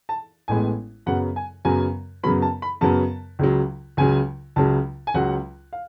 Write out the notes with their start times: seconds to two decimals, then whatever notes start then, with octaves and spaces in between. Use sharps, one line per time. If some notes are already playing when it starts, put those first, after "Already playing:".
0.09 A5
0.48 A1 A2 G#3 B3 G#5
1.06 F#2 C#3 F#3 B3 F#5
1.36 G#5
1.65 F#2 C#3 F#3 B3 G#5
2.23 F#2 C#3 F#3 B3 B5
2.42 A5
2.62 B5
2.81 F#2 C#3 F#3 B3 A5
3.39 C#2 C#3 F#3
3.97 C#2 C#3 F#3 G#5
4.56 C#2 C#3 F#3 A5
5.07 G#5
5.14 C#2 C#3 F#3 F#5
5.73 F5